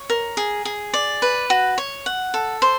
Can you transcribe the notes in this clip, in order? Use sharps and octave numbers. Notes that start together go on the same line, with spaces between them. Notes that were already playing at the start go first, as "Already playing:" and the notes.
Already playing: C#5
A#4
G#4
G#4
D5
B4
F#4
C#5
F#5
A4
C5